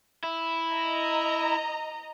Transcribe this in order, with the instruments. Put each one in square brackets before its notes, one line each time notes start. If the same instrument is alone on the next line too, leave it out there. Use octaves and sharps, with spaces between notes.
[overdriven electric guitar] E4
[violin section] D#5 A#5